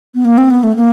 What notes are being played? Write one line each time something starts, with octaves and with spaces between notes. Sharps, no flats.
B3
A#3
C4
B3
A3
A#3